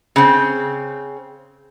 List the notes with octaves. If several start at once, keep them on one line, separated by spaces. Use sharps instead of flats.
C#3 C4